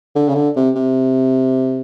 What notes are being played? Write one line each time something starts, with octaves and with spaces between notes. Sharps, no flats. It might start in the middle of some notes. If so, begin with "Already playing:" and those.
D3
C#3
D3
C3
C3